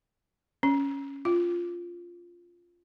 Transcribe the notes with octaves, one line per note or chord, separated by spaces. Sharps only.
C#4
F4